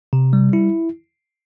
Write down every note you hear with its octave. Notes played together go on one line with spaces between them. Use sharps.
C3
G3
E4